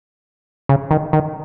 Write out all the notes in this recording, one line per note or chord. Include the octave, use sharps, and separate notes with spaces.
C#3
D#3
D#3